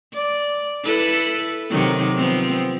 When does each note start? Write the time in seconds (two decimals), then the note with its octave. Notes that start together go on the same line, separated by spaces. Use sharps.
0.13 D5
0.83 E4 A4 B4
1.70 C3 D#3 F#3
2.17 F3 B3 C4